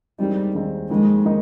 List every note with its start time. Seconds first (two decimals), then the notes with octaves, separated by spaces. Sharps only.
0.19 D#2 D#3 G3 G#3 C4 D#4
0.54 D#2 D#3 G#3 C4 D#4
0.90 F2 D#3 G#3 A#3 D#4
1.25 D#3 A#3 D#4